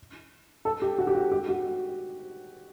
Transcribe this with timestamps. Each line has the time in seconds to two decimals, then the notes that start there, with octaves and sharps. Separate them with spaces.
0.65 A4
0.82 G4
0.98 F#4
1.07 G4
1.15 F#4
1.32 G4
1.49 F#4